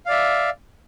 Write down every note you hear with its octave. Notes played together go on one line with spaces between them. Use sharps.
D5 E5 F5